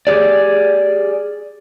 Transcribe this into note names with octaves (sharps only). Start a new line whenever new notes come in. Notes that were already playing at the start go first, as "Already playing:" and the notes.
G4 G#4 D5